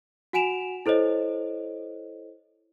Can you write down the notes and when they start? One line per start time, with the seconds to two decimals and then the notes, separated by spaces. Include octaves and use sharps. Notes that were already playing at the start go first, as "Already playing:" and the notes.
0.33 F#4 F#5 G#5 D7 E7 F7
0.86 E4 A4 C5 C#5 D#5